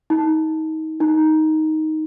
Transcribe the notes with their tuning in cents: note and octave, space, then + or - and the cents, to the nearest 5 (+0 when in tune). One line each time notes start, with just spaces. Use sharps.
D#4 +25
D#4 +10